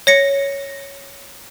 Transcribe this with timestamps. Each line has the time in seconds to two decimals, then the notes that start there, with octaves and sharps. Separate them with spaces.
0.07 C#5 A#6 C#7